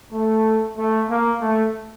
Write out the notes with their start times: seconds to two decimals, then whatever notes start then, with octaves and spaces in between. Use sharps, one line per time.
0.12 A3
0.77 A3
1.09 A#3
1.41 A3